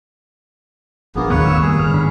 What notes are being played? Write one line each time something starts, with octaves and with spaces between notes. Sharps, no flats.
G#1 B2 F3 A#3 B3 D4 G#4
D#2 A2 D#3 F#3 B3 B4 C#5 F5
F#1 A2 E6
G3 A#3 G#4
G2 D3 F6
G#2 D4 B5